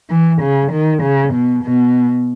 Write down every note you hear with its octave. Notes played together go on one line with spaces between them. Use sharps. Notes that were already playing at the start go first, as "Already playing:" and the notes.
E3
C#3
D#3
C#3
B2
B2